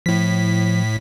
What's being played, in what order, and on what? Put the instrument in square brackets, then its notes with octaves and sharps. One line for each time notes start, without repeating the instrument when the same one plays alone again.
[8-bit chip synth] A2 B6 [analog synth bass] F3